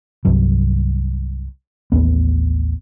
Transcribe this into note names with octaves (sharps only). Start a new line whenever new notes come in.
C2 G2 F#3
A1 D#2 B3